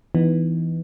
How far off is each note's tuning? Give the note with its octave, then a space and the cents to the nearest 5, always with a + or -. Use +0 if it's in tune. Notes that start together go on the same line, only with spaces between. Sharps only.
E3 +0 B3 +0 D#4 +0